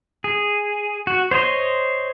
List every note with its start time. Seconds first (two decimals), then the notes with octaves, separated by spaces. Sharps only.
0.24 G#4
1.07 F#4
1.31 C5 C#5 D#5 C6